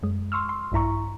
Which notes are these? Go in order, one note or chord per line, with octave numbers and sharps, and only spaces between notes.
F#2 G#3
C6 C#6 E6 F6
C6
A#1 G2 E4 A#5 C#6